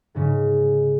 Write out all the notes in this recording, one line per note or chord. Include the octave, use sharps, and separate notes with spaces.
G#2 C#3